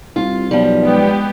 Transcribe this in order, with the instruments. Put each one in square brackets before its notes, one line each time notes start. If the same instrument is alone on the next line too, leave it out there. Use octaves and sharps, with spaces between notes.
[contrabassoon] C2 [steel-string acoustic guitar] F4
[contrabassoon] B1 [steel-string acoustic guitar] F3 G3
[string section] G#3 B3 G4